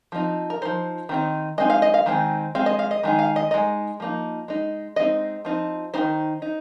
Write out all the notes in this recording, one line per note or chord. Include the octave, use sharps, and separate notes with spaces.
F3 C4 D#4
A#4
F3 A#3 D#4 C5
D#3 C4 D#4
G#3 C4 D#4 D#5
F5
D#5
F5
D#3 G#3 C4 D#4
G#3 C4 F5
D#5
F5
D#5
D#3 G#3 D#4
F5
D#5
G#3 D#4 D#5
F3 A#3 D#4
G#3 D#4
G#3 C4 D#4 D#5
F3 C4 D#4
D#3 C4 D#4 C5
D#4